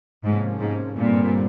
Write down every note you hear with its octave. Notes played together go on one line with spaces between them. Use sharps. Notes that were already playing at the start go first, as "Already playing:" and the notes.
G#2 C3 F3 A#3 C#4
G#2
G2 A#2 D3 G3 C4